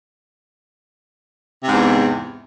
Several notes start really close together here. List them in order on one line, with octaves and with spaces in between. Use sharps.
C3 G#2 E2